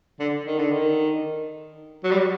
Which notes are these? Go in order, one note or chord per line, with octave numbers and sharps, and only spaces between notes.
D3
D#3
D3
D#3
F#3
G3
F#3